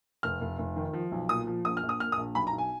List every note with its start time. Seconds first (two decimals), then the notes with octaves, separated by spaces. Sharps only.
0.23 F1 F6
0.41 F1
0.58 F1
0.76 D#3
0.93 F3
1.12 B1
1.29 A#2 D#6
1.47 F3
1.65 A#1 D#6
1.77 F6
1.83 A#1
1.89 D#6
2.00 A#2 F6
2.12 D#6
2.17 A#1
2.35 B1 B5
2.47 A#5
2.53 B1
2.58 G#5